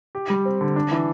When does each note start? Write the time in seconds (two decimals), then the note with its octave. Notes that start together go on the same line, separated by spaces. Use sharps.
0.15 G4
0.30 G3
0.45 C4
0.61 D3
0.76 D4
0.91 E3